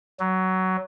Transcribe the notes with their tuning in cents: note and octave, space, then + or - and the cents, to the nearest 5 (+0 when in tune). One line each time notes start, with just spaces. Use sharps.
F#3 +15